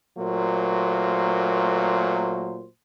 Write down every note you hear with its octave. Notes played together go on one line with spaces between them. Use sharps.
A#2 F#3 A3 A#3 C5